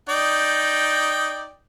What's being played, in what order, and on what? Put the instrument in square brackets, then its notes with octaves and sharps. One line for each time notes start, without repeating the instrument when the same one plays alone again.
[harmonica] D#4 D5 G5